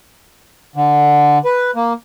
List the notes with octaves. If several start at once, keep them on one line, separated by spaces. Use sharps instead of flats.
D3
B4
A#3